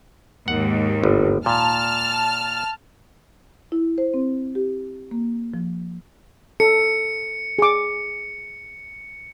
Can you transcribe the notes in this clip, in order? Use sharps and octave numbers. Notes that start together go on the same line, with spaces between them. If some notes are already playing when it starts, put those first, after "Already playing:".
D#2 G#2 F#5
G1
A#2 A5 F6
E4
C5
C4
G4
A#3
F3
A4 C#7
G#4 D6